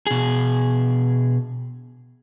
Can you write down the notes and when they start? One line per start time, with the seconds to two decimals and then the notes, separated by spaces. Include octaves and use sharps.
0.07 B2 G#4